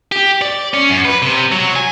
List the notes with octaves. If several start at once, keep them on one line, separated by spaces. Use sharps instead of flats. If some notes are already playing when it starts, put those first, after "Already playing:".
G4
D5
C#4
F#2
B4
C3
F#3
G#5